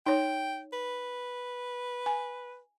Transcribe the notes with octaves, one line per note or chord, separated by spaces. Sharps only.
D#4 C#5 G5
B4
G#5